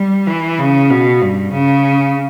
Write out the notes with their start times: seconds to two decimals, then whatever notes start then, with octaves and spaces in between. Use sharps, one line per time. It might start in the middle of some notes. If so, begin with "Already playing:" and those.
Already playing: G3
0.27 E3
0.58 C#3
0.90 B2
1.21 G2
1.52 C#3